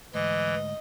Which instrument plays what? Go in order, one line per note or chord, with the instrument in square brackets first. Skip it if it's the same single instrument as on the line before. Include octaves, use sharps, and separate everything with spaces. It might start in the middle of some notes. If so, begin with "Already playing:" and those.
[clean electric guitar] D2 G#2 [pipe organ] E3 [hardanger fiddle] D#5